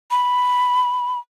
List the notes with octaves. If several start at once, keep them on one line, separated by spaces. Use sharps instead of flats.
B5